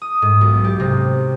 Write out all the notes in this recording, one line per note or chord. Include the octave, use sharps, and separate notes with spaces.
D#6
G#2
B1
G4
C3